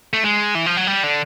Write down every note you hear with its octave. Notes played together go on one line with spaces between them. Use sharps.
A3
G#3
E3
F3
F#3
G3
D3